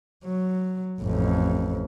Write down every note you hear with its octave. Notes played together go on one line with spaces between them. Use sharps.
F#3
A1 F2